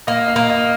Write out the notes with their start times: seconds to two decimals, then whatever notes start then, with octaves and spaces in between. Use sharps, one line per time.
0.07 A#3 D#5
0.28 F5
0.36 A#3
0.50 D#5